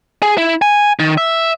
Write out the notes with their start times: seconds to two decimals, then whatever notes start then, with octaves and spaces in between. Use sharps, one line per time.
0.23 G#4
0.37 E4
0.62 G#5
0.99 D#3
1.17 E5